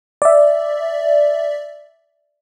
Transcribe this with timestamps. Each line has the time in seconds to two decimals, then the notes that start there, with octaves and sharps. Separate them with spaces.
0.22 D5 E5